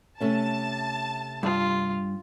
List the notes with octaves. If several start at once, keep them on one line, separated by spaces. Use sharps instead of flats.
C3 A3 C#4 A5
G2 F4